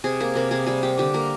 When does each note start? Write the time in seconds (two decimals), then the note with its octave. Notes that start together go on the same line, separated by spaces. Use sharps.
0.04 C3 G#4
0.20 A#3 A#4
0.35 C3 A#4
0.51 C3 G#4
0.66 G3 G#4
0.83 G3 G4
0.98 D3 G4
1.14 A#3 A#4